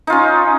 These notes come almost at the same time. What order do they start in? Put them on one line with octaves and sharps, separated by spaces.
D#4 F4 C#4